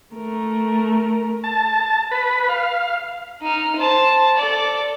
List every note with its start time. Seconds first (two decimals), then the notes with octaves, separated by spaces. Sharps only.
0.15 A3 A#4
1.44 A5
2.11 B4
2.49 F5
3.42 D#4 F6
3.76 C5 A5
4.36 A4 D5